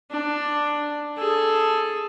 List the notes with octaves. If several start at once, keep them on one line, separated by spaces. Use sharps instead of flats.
D4
G#4 A4